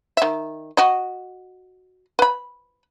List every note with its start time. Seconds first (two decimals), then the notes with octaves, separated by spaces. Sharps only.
0.17 D#3 E5
0.77 F#4 D#5
2.19 B4 B5